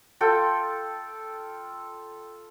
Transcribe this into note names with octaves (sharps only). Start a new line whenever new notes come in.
F4 A4 G5